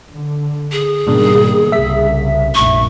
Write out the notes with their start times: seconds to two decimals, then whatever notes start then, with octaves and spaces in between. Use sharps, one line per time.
0.13 D3
0.72 G#4
1.07 G#2 B2 D#3 G3 A#3 D4
1.72 C2 C#3 E5 B6
2.55 F1 A#1 F#2 C#6